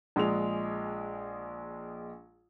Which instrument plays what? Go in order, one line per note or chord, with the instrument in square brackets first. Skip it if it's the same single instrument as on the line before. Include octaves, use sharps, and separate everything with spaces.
[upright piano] A#1 G#3 G#4 F7